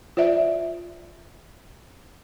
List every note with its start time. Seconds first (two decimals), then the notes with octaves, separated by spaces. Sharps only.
0.17 F4 C5 D5 E5